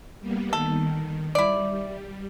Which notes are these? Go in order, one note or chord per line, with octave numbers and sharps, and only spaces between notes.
G3 A#3 B3
D#3 A4
G3 E4 D5